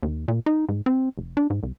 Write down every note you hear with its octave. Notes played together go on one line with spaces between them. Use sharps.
D#2
A#2
D#4
G#2
C4
F1
D4
G#2
C2